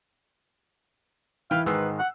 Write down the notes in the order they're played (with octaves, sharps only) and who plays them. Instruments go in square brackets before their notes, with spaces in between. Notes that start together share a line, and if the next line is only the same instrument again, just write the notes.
[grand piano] E3 E4 [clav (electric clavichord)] B4 G5 [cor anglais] F5
[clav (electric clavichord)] G#2 D#3 G#3 [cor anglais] B4 [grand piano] E6 C7
[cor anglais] F#5